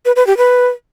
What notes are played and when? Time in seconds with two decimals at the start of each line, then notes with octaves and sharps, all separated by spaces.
0.05 B4
0.16 B4
0.27 G4
0.37 B4